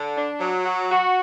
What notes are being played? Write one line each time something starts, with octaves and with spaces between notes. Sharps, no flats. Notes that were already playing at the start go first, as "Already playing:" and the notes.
Already playing: D3
D4
F#3
F#4
F#4